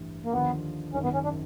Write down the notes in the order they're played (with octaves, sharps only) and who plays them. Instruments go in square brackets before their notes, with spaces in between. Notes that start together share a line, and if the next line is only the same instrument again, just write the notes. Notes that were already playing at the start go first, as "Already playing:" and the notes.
Already playing: [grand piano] A1 G2 E3
[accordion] A#3
[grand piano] D#2 D3 F3 [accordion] B3
[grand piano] G#1 F#2 D#3 [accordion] C#4
[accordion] B3
C#4
D4